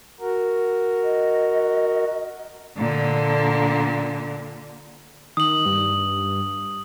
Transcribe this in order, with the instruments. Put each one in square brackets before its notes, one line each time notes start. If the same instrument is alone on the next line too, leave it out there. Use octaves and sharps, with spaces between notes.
[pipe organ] F#4 A#4
[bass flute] D#5
[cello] A#2 D3
[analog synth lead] D#3 [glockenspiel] D#6 F#7
[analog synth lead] G2